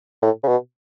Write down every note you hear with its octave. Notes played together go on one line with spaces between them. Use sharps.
A2
C#3
B2